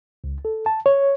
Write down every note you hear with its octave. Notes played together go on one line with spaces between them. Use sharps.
C#2
A4
A5
C#5